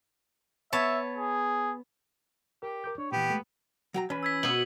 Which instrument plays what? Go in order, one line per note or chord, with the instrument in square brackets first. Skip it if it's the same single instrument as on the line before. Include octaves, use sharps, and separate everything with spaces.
[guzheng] B3 C#5 A5 [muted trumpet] E5
[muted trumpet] G#4
[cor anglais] G4 [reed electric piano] A#4
[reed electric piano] A#4 D6 G6
[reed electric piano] D4 [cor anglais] C#5
[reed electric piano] A#2 E3 [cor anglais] B3 [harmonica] G4
[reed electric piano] G#3 A3 B4
[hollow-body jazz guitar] F#3 G5 A#5
[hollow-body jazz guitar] E3 [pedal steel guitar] C#4 B4
[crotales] E6 G#6 B6
[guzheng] B2 B3 [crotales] E6 F#7